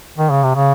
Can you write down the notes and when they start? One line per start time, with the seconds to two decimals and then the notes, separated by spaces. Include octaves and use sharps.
0.18 D#3
0.31 C#3
0.43 C3
0.55 C#3